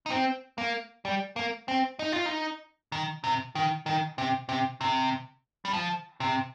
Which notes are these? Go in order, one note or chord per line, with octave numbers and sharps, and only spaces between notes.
D#4
C4
A#3
G3
A#3
C4
D#4
F4
D#4
D#3
C3
D#3
D#3
C3
C3
C3
G3
F3
C3